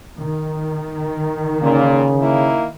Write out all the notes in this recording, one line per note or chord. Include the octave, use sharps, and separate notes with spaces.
D#3
A#2 C#3 A#3
A#3 D#4 E4